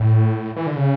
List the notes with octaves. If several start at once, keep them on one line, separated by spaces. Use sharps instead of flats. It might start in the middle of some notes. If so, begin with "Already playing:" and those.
Already playing: A2
E3
D3
C#3